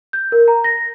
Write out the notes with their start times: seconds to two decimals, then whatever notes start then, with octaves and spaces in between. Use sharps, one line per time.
0.13 G6
0.32 A#4
0.48 A#5
0.64 A#6